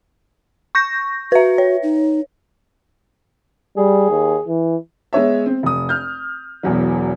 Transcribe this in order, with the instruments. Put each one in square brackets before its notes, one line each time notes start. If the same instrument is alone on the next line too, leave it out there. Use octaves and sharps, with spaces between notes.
[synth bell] C#6 G6 A#6
[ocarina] F#4 [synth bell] B4 E5
[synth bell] C#5
[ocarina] D#4
[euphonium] G3 [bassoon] G#4
[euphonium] D#2
E3
[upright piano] G#3 B3 C#5 E5
C4
F1 D#6
F6 G6
E1 E2 F#3